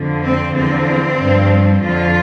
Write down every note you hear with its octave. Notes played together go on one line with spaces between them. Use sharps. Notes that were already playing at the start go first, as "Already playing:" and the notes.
Already playing: F2 D3 F3
C4
E2 D3 F3 C4
G2 F3
F2 D3 F3 F4